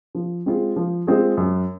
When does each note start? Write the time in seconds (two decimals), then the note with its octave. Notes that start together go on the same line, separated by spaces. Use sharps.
0.15 F3
0.46 G#3 C4 F4 G#4
0.76 F3
1.07 G#3 C4 F4 G#4
1.37 F#2